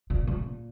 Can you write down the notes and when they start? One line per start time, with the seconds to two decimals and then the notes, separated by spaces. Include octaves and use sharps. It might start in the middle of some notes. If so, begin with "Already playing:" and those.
0.10 A#2
0.27 A#2